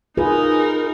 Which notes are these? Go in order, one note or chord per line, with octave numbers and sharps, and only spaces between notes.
D#4 F4 G#4 A#4 B4